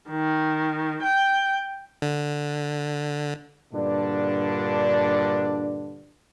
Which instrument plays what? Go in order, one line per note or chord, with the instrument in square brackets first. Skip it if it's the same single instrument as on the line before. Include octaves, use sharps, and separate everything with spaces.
[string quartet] D#3
G5
[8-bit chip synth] D3
[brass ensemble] G2 A#2 D3 D4